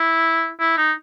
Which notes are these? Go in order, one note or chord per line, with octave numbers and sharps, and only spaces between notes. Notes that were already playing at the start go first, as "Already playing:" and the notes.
Already playing: E4
E4
D#4